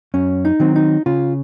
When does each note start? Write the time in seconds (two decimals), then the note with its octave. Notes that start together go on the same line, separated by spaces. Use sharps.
0.14 F#2 C#4
0.45 D#4
0.60 D#3 F#3 C4
0.76 D#4
1.06 C#3 F4